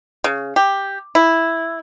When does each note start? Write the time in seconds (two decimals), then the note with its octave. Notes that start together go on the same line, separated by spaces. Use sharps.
0.24 C#3
0.56 G4
1.15 E4